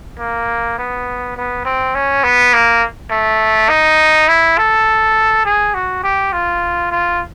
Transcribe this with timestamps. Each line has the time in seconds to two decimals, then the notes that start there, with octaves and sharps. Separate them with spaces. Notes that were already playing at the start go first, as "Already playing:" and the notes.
0.19 A#3
0.78 B3
1.37 B3
1.65 C4
1.95 C#4
2.24 B3
2.53 A#3
3.11 A3
3.69 D#4
4.28 E4
4.58 A4
5.45 G#4
5.74 F#4
6.03 G4
6.33 F4
6.91 F4